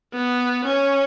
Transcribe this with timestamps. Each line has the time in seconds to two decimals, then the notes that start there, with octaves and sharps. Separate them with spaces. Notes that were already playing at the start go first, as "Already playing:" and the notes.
0.14 B3
0.65 C#4